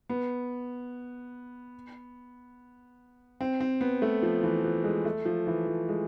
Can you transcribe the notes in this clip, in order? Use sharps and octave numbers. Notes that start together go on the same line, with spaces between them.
B3
C4
C4
B3
A3
F3
E3
F3
G#3
A3
F3
E3
F3
G#3